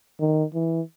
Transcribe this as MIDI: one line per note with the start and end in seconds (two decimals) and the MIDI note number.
0.20 0.44 51
0.54 0.81 52